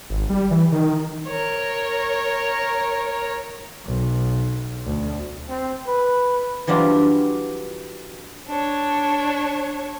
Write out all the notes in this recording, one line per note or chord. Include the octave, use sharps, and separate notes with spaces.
G#1
G3
E3
D#3
A#4 C#5
B1
D2
C4
B4
E3 F#3 G3 D4 F4
D4 C#5